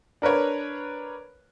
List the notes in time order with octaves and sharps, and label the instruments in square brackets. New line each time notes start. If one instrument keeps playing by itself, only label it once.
[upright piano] D4 A#4 B4 C#5